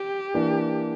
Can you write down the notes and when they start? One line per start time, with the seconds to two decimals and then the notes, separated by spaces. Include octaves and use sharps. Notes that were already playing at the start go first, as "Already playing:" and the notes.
Already playing: G4
0.34 E3 A#3 D4